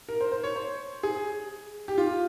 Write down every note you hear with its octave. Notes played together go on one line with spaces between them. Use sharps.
A#4
C5
C5
C#5
C5
G#4
G4
F4